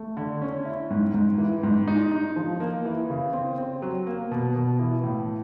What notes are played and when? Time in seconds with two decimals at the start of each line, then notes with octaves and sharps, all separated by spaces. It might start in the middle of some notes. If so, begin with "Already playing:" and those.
Already playing: A3
0.17 D3
0.42 C#4
0.65 E4
0.91 G#2
1.14 G#2
1.38 E3
1.63 G#2
1.88 D#4
2.12 D#4
2.36 F3
2.60 A#3
2.85 E3
3.10 C#3
3.33 C4
3.58 C4
3.82 F#3
4.07 A#3
4.31 B2
4.56 B2
4.79 E3
5.04 A2